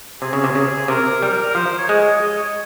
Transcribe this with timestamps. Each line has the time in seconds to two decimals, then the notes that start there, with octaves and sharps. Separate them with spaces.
0.22 C3 G#4
0.33 C#3
0.44 C3
0.55 C#3
0.88 C3 A#4
1.22 G3
1.55 F3 C5
1.78 C#5
1.89 G#3
2.00 C#5
2.22 D#5
2.38 C#5